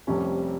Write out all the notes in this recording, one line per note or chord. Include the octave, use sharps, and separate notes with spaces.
F1 F2 C3 G3 C#4